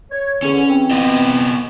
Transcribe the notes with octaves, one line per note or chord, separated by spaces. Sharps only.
C#5
E2 D3 C#4
E3 C4
B3 F4 D#5